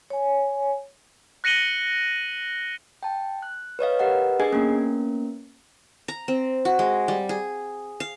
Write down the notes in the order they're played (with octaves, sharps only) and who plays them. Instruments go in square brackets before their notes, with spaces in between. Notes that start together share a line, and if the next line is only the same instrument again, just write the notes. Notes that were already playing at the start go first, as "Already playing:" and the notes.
[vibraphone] C#5 G#5
[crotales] F#6 A#6 C#7 D#7 F#7 G7
[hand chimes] G5 A5
F#6
B4 C#5 D#5 F5
G4 A#4 B4 D#5 F#5
D4 G#4 D#5 G#5 G#6 C7
A#3 B3 C#4 A#4
[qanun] A#5
C4
F#4
G#3
G3
G#4
F5